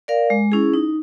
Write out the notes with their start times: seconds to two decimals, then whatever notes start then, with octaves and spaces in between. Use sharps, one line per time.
0.08 A#4 D5 F5
0.30 G#3
0.52 C#4 E4 G#4
0.74 D#4